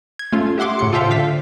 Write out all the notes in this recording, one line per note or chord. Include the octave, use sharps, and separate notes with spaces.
G#6
A3 C#4 F4
G4 E5 F#5 C6 D6
A2 C#3 C#7
F4 A4 C5 E5 F5 G5
D3 F5 B6